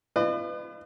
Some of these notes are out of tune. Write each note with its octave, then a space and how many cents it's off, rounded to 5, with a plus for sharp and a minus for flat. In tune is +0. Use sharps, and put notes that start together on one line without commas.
F4 -45 B4 +25 D#5 -45